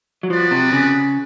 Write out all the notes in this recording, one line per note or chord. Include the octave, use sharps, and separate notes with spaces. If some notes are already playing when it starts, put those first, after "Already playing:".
F#3
F3 B3 D4 F#4 B4 D5
C3
C#3